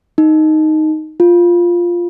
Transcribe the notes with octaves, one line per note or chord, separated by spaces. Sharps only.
D#4
F4